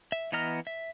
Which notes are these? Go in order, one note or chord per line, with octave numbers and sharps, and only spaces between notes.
E5
E3 B3 D#5 A#5 F6
E5